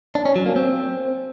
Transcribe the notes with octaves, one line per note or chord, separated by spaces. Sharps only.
D4
C#4
F#3
A#3
C4